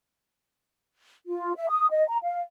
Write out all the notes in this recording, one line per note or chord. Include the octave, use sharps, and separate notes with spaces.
F4
E5
D#6
D#5
A#5
F5